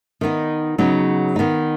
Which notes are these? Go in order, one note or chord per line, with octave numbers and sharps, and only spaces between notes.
D#3 B3 D#4
C#3 F#3 B3 D#4
D#3 B3 D#4